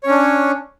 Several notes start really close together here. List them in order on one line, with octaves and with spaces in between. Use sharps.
C#5 C#4 D4